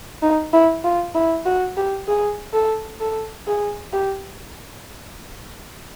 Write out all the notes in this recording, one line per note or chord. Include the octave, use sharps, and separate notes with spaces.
D#4
E4
F4
E4
F#4
G4
G#4
A4
A4
G#4
G4